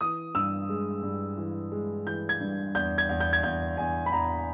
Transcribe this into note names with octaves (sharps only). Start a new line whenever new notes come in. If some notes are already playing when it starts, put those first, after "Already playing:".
E3 D#6
G2 E6
G#3
G2
E3
G#3
E3 G6
G#6
G2
E2 G6
G#6
E2
G6
G#6
E2 G6
E2 G#5
B5
E2 A#5